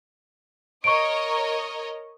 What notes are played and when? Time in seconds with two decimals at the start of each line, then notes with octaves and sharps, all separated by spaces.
0.84 A#4 C#5 D#5 C#6 D7